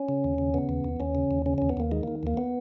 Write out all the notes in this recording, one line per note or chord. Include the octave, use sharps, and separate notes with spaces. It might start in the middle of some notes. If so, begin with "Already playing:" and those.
Already playing: C#4
C#3
D#2
C#3
C#3 B3
D#2
D#2
D#2 C#4
C#3
D#2
C#3 C#4
D#2 C#4
B3
D#2 A#3
D#3 G#3
D#3 A#3
D#2 A#3
B3